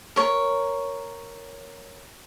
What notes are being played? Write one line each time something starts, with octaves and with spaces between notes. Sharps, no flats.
A#4 C#5